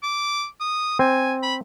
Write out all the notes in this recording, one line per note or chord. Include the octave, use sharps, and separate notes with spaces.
D6
D#6
C4 G#5
B5